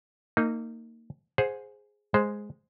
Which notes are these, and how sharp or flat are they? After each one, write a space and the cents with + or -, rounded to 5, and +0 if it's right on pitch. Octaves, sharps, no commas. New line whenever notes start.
A#3 -25 D#4 +0
G#4 +0 C5 +0 F#5 -25
G#3 +0 C5 +0